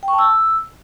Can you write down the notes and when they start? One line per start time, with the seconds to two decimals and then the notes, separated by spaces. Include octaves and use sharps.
0.03 G5
0.08 C#6
0.13 A5
0.19 E6